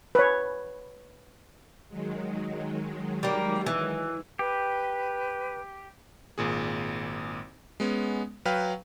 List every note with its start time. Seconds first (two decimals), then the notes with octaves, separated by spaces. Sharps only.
0.15 B4 C#5
1.89 D#3 F#3 G#3
3.23 G3 A#3
3.66 E3
4.39 G4 B4
6.38 G#1 A#2 G#4
7.80 G#3 B3 C#4
8.45 F#3 B4 F5 G5 F6